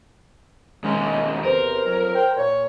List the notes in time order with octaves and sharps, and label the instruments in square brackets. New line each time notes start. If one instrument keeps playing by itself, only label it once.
[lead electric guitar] D#2 C#4 [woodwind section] G#3
[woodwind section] E2 C3 C5 [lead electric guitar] A#4
[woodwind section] F2 F#3
C5 G5
A#2 C#5